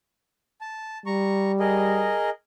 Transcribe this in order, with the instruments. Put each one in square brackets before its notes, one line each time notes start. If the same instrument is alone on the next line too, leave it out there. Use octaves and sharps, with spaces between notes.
[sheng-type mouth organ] A5
[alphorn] G3 [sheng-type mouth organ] A#5 C#6
[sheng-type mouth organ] G#4 A#4 D#5